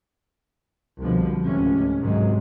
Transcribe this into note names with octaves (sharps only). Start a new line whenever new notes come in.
C2 B2 D3 F3
C#2 G#2 C3 A3 C#4
G#2 C3 D#3 F#3 G#3